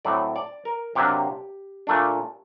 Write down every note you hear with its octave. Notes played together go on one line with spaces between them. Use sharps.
A2 F#3 A3 C4 D5
D5
A#4
C3 F#3 A#3 D4 G4
A#2 A3 D4